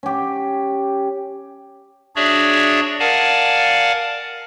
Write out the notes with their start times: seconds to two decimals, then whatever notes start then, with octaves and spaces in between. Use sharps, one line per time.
0.03 C#4 G4
2.16 D4 F#4 G#4 C#5 D5 E5
3.00 A#4 D5 F5 F#5 G#5 A5